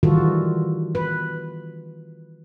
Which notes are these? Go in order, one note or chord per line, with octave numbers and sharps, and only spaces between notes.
D#3 E3 G3 F4 F#4 A4
B4